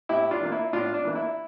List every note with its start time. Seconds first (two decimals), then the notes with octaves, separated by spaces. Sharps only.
0.09 A2 E4 G4
0.31 D4 F4
0.41 E3 A#3
0.52 E4
0.73 A2 D4 F4
0.94 D4
1.05 E3 A#3
1.15 E4